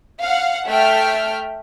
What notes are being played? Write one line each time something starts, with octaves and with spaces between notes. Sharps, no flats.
F5 F#5
A3 E5 G5 F6